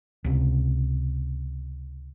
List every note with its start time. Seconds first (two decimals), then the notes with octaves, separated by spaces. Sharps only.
0.24 C#2 C3